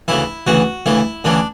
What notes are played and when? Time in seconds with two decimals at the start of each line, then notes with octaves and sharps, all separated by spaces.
0.08 D2 C#3 E3 E4
0.47 D2 C#3 E3 F#4
0.86 D2 C#3 E3 E4
1.24 D2 C#3 E3 D4